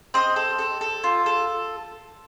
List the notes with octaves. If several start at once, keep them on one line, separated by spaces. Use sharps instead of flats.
C4 D#5
A4
A4
A4
F4
A4